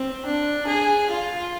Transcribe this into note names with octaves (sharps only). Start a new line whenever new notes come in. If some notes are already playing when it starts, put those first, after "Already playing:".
Already playing: C4
D4
G#4
F4